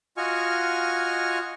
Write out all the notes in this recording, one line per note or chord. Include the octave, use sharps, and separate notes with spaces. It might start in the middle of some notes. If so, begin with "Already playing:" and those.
F4 F#4 D#5 G#5 C#6 F6